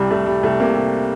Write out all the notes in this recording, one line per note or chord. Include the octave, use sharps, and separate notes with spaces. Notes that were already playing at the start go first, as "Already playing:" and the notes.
Already playing: C2 G3
C2 A3
C2 G3
C2 A3
C3 A#3
C3